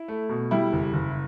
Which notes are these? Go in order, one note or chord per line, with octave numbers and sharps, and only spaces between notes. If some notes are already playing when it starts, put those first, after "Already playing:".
Already playing: E4
A3
B2
G3 E4
F#1
F#1